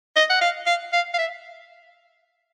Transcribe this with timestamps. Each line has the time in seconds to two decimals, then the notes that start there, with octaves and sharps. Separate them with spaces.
0.16 D#5
0.30 F#5
0.41 F5
0.67 F5
0.93 F5
1.14 F5
1.18 E5